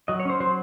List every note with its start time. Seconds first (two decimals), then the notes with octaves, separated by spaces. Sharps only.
0.08 F#3 D#5
0.20 C#5
0.25 C#4 C5
0.40 F#3 C5